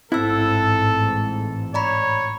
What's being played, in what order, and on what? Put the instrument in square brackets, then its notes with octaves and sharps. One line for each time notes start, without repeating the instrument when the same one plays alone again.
[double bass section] A1 G#2 [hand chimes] C4 E6 [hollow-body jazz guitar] E4 [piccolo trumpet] A4
[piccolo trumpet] C#5 [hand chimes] D5 A#5 B5